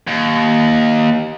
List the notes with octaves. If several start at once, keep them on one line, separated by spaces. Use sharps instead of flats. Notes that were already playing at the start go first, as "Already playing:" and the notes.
D#2